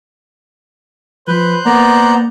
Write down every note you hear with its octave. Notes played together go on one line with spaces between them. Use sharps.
F3 B4 C5 F#6 G6
A#3 B3 D5 A#5